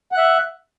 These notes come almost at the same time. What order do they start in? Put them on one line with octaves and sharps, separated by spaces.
F#5 F#6 E5